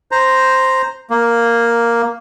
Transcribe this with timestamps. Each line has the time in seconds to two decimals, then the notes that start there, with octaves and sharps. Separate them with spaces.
0.11 C5 A#5
1.10 A#3